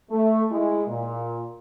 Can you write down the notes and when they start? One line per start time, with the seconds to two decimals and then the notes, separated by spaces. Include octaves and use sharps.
0.10 A3
0.51 G#3 E4
0.87 A#2